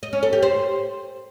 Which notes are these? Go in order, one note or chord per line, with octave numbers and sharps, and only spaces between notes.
D#5
C#4
A4
G4
C5